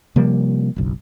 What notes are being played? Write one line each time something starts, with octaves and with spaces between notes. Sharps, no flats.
C3 F3 G3 A#3
F#1 B1